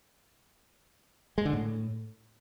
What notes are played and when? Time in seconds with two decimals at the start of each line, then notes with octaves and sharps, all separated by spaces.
1.38 G#3
1.45 D3
1.53 A2